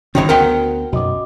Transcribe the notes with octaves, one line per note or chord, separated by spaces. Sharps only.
G1 E2 D#3 C#4 D#4 F#4 C5 C#5
D2 B3 A#4 F#5 G5
B1 F#2 F#4 D#5 D6